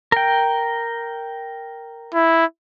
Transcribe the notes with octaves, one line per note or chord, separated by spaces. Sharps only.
A#4 G5
E4